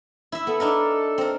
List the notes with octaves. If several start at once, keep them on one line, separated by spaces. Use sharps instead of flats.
E4 E5
B3 A4
D4 D#4 A#4
C4 A#4